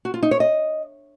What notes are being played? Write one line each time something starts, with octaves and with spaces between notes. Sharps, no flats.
F#4
F4
D#4
C#5
D#5